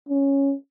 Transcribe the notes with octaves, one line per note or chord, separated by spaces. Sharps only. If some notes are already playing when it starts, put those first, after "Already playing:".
C#4